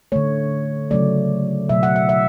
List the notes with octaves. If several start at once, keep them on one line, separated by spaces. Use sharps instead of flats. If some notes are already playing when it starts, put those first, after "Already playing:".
D3 A3 C#5
C#3 F#3 A3 D5
B2 F#3 A3 E5
F#5
E5
E5